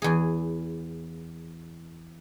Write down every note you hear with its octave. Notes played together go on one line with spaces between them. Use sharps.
E2 G#4